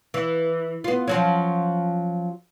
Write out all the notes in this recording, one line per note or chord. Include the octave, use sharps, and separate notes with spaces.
E3
B3 F4
F3 F#3 C#4